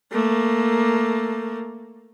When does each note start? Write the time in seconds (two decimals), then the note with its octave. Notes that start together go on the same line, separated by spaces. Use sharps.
0.12 A3 A#3